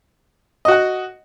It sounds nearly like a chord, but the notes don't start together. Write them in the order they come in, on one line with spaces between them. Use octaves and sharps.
D#5 F#4 F#5